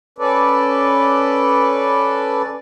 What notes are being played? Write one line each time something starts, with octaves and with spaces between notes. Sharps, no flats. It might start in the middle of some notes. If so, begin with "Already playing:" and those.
C#4 A4 B4 D5